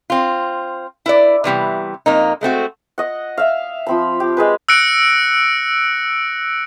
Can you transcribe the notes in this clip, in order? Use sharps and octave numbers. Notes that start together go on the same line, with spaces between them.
C4 F4
E4 B4 D5
C3 E3 G3 B3
F2 A#3 D#4
G#3 A3 C4 F#4
D#5 F#5
E5 F5
F3 C4 B5
G4
G#3 G#4 B4
E6 F#6 A#6 C#7 D7